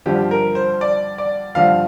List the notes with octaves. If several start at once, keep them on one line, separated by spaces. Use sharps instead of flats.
G2 D3 F3 G4
A#4
C5
D5
D5
G2 D3 F3 F5